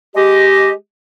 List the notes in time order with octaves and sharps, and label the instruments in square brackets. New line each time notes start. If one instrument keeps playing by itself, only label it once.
[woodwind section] G#3 G4 D#5